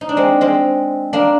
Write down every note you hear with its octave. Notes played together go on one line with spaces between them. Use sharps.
D#4
D4
G#3 C4
G#3 C4
A#3 D4